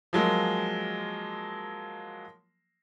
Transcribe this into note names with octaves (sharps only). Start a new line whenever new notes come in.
F3 F#3 G#3 A#3